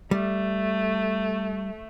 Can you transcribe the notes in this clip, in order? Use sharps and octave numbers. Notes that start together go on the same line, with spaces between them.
G3 A3